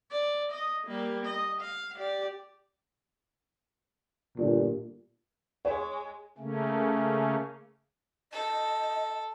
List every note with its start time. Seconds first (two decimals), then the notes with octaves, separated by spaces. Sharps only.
0.11 D5
0.52 D#5
0.87 G3 A#3
1.26 D#5
1.61 F5
1.96 G4 D5
4.37 G1 A#2
5.65 G#3 C#5
6.38 C#3 A3 A#3 C#4
8.33 A4 D#5